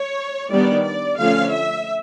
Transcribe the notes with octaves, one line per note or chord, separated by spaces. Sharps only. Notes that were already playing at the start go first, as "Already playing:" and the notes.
Already playing: C#5
D#3 G3 B3 D4 D5
D5
D3 F3 A3 C#4 F5
E5